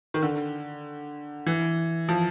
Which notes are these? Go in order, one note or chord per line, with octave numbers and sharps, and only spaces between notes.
D#3
D3
E3
F3